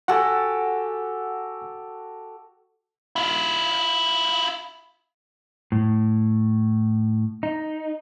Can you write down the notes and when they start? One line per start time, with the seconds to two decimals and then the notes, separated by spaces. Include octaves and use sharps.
0.08 F#4 G4 A4 F#5 G#5
3.16 E4 F4
5.72 A2
7.43 D#4